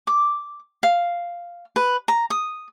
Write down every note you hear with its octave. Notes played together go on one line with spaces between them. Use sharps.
D6
F5
B4
A#5
D#6